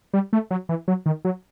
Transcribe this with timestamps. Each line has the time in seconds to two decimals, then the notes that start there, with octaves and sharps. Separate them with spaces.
0.14 G3
0.33 A3
0.51 F#3
0.69 E3
0.88 F#3
1.06 D#3
1.25 F#3